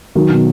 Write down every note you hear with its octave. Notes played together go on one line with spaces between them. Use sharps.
D#3 F#3
B2